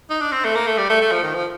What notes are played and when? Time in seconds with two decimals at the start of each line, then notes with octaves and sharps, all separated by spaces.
0.10 D#4
0.21 D4
0.32 C4
0.44 A3
0.55 A#3
0.67 A3
0.78 G3
0.90 A3
1.01 A3
1.11 F3
1.23 D#3
1.34 F3